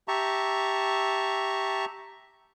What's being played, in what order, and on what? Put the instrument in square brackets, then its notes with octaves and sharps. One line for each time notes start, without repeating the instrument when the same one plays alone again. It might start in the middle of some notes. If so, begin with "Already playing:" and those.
[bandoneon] G4 E5 A5 A#5 C#6